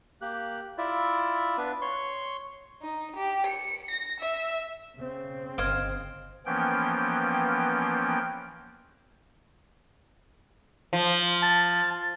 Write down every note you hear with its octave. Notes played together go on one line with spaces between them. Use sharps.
A#3 G4 F#6
E4 F4 D5 E5
B3 D4 B4
C#5 C6 C#6
D#4
G4
C#7
A#6
E5
C#3 C4
G1 C5 D#5 F5 F6 G#6 D7
E3 F3 A#3 B3 C#4 G5
F3
A5